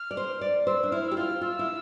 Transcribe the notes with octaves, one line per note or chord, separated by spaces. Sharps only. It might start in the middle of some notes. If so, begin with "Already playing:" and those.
Already playing: F6
D5
C5
D5
C5 E6
D4
E4 F6
G4 E6
F4 F6
F4 E6
E4